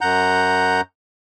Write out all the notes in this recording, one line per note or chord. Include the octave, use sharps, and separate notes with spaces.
F#2 F#5 A#5 G6